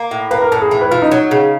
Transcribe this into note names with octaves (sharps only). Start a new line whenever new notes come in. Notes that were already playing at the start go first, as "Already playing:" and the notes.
Already playing: A#3
A2
A#3 B4
A#4
A2 A4
G#4
E3
B4
E3 F4
D#4
F#3
C#3